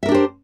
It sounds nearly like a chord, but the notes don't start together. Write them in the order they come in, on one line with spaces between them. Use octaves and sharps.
E5 A#4 D4 G4 C5